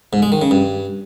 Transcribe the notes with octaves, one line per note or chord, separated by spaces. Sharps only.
G#2
G#3
D#3
C#3
G2